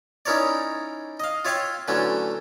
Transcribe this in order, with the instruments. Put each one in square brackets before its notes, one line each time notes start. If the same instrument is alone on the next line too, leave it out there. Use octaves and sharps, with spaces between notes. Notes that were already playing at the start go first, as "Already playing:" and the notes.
[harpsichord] C#4 D#4 E4 A#4 C#5 D5
D#5 F5
F4 C#5 E5 F5 G5 C#6
D3 E3 F#3 A3 C#4